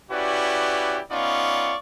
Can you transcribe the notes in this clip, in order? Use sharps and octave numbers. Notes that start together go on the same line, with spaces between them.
C#4 E4 F#4 G4 B4 D5
B3 C#4 D#4 F4 D5 C#6